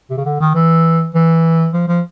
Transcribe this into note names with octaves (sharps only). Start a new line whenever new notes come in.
C3
C#3
D3
D#3
E3
E3
F3
F3